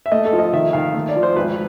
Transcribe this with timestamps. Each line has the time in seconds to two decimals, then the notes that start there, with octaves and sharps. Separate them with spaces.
0.06 E5
0.12 A3 D#5
0.25 A4
0.33 F3
0.39 D#5
0.53 D#3 E5
0.73 D#3 F5
0.94 A3
1.09 D5
1.16 F3
1.23 C5
1.36 G#1 B4